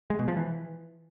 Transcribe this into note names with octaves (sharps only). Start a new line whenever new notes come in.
G#3
B2
F3
E3